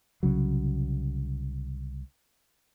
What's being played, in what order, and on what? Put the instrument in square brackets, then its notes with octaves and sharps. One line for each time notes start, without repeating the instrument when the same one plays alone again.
[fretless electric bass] C2 C#3 F#3